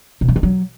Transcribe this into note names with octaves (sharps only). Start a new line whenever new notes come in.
B2
F#3
D#3
F#3